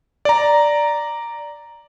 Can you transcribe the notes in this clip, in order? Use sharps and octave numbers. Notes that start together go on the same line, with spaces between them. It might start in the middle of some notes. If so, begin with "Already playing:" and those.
D5 A#5